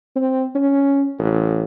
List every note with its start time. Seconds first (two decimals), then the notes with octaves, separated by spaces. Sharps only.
0.16 C4
0.55 C#4
1.19 A1